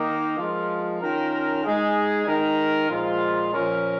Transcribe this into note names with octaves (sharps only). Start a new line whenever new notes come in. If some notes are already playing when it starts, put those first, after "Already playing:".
Already playing: D#3 A#3 D#4
F3 G#3 F4 A#4
D#3 C#4 F4 A#4
G#3 D#4 G#4
D#3 G#3 D#4 A#4
A#2 F3 G#3 F4
A#2 F3 C#4 A#4